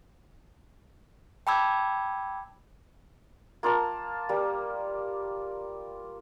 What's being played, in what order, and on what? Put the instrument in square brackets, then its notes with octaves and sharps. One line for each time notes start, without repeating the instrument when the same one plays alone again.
[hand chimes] G5 A5 B5 D6 E6 G#6
[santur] A#3 F4 A#4 A5
G3 A#3